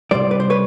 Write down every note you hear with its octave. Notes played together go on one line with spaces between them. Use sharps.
C2 A#2 G3 C5 D5
B4
C5
B4 C#5